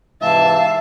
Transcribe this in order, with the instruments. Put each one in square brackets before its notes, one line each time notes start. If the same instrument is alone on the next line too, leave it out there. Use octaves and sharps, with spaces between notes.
[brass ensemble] G#2 C3 E3 [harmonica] E5 [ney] F5 [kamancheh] A5